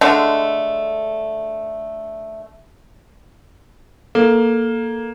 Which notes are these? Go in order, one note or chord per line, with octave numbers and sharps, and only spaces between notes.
D3 G#3 A3
A#3 A4